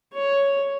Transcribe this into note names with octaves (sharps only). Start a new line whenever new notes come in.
C#5